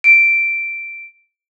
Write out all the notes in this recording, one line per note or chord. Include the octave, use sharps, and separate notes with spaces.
D7